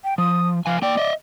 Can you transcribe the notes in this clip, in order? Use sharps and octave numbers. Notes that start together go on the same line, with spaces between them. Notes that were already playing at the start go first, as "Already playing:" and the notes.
G5
F3 D#6
F3 F5 G#5
A#3 D5 G5
D#5 E5